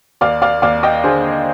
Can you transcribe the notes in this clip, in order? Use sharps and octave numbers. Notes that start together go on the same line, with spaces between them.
D#2 D5 F5
D5 F5
D#2 D5 F5
D#5 G5
D3 G#4 C5